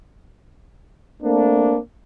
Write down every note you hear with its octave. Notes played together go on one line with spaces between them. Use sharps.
A3 A#3 C4 D4